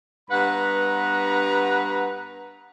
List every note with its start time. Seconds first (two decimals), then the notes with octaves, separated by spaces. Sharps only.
0.30 G2 B3 B4 F#5 A#5